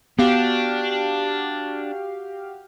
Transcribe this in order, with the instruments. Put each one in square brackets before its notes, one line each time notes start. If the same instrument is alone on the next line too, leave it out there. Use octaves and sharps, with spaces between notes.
[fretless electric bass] B3 [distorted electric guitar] D4 [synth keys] F#4 G4 F5